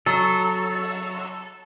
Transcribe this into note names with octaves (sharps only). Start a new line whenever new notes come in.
F#3 A4